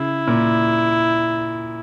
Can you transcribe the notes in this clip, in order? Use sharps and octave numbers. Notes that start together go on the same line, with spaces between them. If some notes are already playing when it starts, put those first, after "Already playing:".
Already playing: C#3 E4
A#2